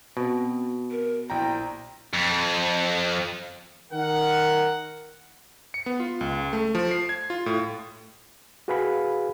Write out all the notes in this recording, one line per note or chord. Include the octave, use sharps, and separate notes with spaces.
B2 C4
A#4
A#1 E4 G5 A#5
F2
D#3 A#4 F#5
C#7
B3
F4
C#2
A3
F3
C7
G#6
F4
A2
F#4 G#4 B4 F5 G#5 B5